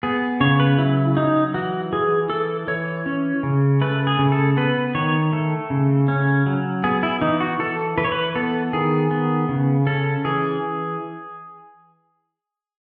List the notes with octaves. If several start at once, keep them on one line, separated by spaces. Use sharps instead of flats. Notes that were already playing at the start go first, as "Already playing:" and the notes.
B3 G#4
C#3 C#5
B4
F#3 E4
F#3 D#4
E3 F#4
E3 G#4
E3 A4
E3 C#5
C#4
C#3
A3 B4
G#4
C#3
A4
B3 B4
D#3 C#5
A3 A4
C#3
C#4
F#3
B3 G#4
E4
E3 D#4
F#4
E3 A4
E3 B4
C#5
B4
B3 A4
D#3 G#4
B3
C#3
C#4 A4
E3 G#4